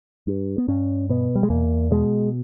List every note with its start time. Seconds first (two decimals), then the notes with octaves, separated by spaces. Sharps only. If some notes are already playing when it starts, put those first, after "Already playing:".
0.27 G2
0.58 B3
0.68 G2 C#4
1.09 B2 B3
1.36 G3
1.43 G#3
1.50 E2 A#3
1.91 B2 G#3